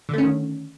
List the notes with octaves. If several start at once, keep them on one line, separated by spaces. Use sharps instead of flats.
D3 D#3 A3 C#4